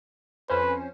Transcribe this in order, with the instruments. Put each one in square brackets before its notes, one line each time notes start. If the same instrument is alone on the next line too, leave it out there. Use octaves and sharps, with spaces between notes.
[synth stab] F2 C#4 C5 [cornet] B4